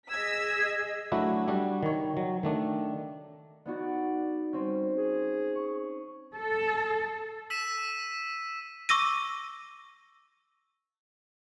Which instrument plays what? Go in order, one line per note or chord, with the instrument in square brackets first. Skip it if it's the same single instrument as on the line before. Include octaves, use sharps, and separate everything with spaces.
[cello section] G#4 D#5 [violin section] E6 B6 [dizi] G#6
[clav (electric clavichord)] F#3 A3 D4 E4 F#4
G3 D4 F#4
D#3 C#5
F#3
D#3 A3 D4
[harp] B3 D#4 F#4 [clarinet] D5
[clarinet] G3 [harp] C4 C#4
[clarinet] G#4
[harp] C#6
[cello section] A4
[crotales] E6 B6 D#7 E7
[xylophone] C#6 D6 E6 A#6 D#7